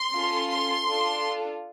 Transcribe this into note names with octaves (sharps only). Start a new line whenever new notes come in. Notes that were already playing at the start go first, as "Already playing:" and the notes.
Already playing: C6
C#4 F4 A4
C6
D4 F4 A4